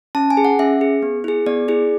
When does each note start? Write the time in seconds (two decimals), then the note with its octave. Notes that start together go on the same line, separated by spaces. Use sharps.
0.15 C#4 A5
0.30 G#5
0.37 G#4
0.45 F#5
0.59 C#4 E5
0.81 G#4
1.02 B3
1.24 E4 G#4
1.46 B3 D5
1.68 E4 G#4